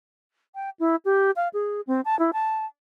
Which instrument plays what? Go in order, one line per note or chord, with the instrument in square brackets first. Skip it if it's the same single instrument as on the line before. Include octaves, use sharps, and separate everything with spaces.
[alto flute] G5
E4
G4
F5
G#4
C4
A5
E4
A5